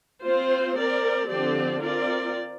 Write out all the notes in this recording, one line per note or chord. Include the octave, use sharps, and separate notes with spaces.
C4 F4 C5
C4 A#4 D5
D3 F3 C4 G4 D5
C4 F4 A#4 D5